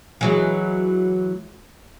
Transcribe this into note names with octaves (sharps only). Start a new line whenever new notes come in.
E3 F#3 G#3